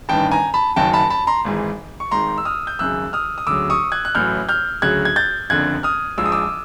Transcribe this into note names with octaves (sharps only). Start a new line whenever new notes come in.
A1 G2 D#3 G5 A5
G#5 A#5
A5 B5
F#1 F#2 D#3 F#3 G5 A5
A5 B5
A5 B5
A#5 C6
G#1 G#2 E3
C#6
G#1 G#2 D#3 A#5 C6
E6
D#6 F6
G6
G#1 F#2 C#3 E6 F#6
D#6 F6
D#6
D2 C#3 F#3 D6 E6
C#6 D#6
F#6 G#6
F#6
A1 A2 F#3 F6 G6
F6 G6
D2 C#3 F#3 F#6 G#6
G#6
G6 A6
F#1 F2 D3 F#6 G#6
D#6 F6
A#1 G#2 F3 E6
D#6
D6 E6